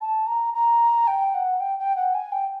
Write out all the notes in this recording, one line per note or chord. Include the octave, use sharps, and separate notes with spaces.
A5
A#5
A#5
G5
F#5
G5
G5
F#5
G#5
G5